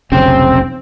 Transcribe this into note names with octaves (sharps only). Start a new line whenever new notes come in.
F1 B1 C#3 C4